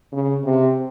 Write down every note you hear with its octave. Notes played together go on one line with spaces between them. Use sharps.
C#3
C3